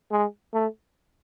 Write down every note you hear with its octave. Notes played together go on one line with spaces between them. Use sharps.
G#3
A3